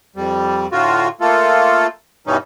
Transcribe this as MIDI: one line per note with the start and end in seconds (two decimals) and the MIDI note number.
0.16 0.67 41
0.16 0.67 55
0.72 1.08 45
0.72 1.08 50
0.72 1.08 65
0.72 1.08 66
1.21 1.87 57
1.21 1.87 58
1.21 1.87 65
1.21 1.87 69
2.27 2.37 43
2.27 2.37 47
2.27 2.37 52
2.27 2.37 55
2.27 2.37 61
2.27 2.37 63